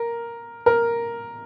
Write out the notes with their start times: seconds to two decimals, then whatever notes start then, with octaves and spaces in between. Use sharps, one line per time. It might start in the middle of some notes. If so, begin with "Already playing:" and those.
Already playing: A#4
0.66 A#4